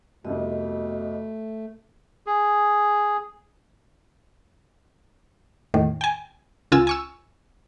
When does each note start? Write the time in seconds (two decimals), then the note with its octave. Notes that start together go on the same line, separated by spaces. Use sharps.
0.25 C2 F2 B2 A3 D#5
2.27 G#4
5.74 E2 A2 D#3
6.01 G5 G#5
6.72 C#2 F4 G#5 E6
6.87 G#5 C#6 E6